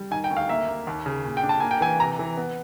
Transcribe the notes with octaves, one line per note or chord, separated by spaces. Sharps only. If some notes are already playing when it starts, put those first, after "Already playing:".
Already playing: G3
D#3 G#5
G5
D2
F5
A#3 E5
A#3
D#2
C#3
A#2
G5
D4
A5
A#3 G#5
G5
E3 G#5
C3 A#5
E3
B3